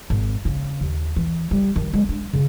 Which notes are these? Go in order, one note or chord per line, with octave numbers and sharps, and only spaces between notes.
G#1
C#3
D#2
E3
G3
D#3
G#3
D4
C#3